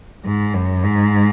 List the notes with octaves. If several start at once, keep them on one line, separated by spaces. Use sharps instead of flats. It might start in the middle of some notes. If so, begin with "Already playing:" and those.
G#2
F#2
G#2